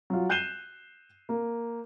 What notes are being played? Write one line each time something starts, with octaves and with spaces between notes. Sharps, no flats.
F#3 F4
F#6 G6 C7 D#7 E7 G7
A#3